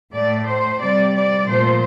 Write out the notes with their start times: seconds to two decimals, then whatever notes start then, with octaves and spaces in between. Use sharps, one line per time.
0.13 A2 A3 D5
0.46 C5
0.79 C3 G3 D5
1.13 D5
1.46 A#2 F3 A3 C5